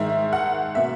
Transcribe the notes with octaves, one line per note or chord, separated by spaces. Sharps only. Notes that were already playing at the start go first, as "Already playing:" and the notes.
Already playing: G#2 D#3 G#3 E5
F#5
B2 A#3 E5